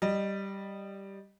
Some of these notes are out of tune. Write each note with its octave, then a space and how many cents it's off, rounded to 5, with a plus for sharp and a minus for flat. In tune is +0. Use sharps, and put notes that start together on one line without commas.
G3 +0 D#5 -15